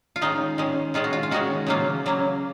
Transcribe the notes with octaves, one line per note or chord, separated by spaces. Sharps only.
F4
D#3 G#3 C#4 D#4
D#3 G#3 C#4
D#3 G#3 C#4 F4
F#4
F4
F4
D#3 G#3 C#4 F#4
C#3 F#3 A#3 C#4 F4
C#3 F#3 A#3 C#4